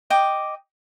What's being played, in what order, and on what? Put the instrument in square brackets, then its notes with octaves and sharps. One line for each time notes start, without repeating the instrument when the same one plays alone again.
[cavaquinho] D#5 G5 D6